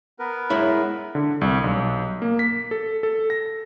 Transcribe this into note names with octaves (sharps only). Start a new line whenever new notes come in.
B3 A#4 B4
G#3 E4 C#5
D3
C2
B1
A#3
B6
A4
A4
A#6